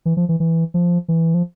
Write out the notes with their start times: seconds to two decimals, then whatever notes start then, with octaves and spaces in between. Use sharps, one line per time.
0.06 E3
0.17 F3
0.29 E3
0.40 E3
0.74 F3
1.08 E3
1.34 F3